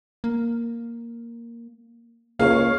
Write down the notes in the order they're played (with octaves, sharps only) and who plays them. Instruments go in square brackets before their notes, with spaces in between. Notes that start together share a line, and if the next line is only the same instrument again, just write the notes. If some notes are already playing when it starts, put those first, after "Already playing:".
[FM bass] A#3
[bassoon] C#2 [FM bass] A#3 [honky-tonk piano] C#5 F5